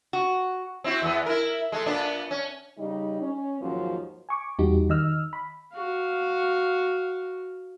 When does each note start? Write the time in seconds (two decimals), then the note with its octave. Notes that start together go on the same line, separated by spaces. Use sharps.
0.13 F#4
0.84 C4 E4 F#4
1.02 E2 B3
1.26 E4 A#4
1.72 G#3 A3
1.86 A#2 B3 D4
2.31 C#4
2.78 C#3 G3 D#4
3.21 C#4
3.61 D#2 G#2 F3 F#3
4.29 G#5 C#6 D6
4.59 E2 G3 D#4 F#4 G4
4.89 D#3 D#5 E6 F6
5.33 B5
5.74 F#4 F5